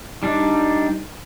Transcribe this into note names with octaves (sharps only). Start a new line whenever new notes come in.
G3 D4 D#4